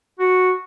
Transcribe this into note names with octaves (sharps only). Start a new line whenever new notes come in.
F#4